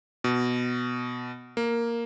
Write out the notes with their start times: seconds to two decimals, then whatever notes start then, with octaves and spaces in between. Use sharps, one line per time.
0.24 B2
1.57 A#3